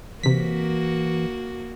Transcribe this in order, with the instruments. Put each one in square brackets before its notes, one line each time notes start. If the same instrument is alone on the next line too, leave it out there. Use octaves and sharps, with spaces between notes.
[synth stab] C3 B6 [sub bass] E3 [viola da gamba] A#3 F#4